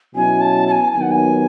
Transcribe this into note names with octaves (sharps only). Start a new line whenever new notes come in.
B2 F#3 C#4 E4 G#5
A5
A5
G#5
D#2 D#3 F#3 B3 G#5
F#5
G#5